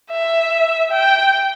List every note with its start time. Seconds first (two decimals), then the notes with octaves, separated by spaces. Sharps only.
0.11 E5
0.92 G5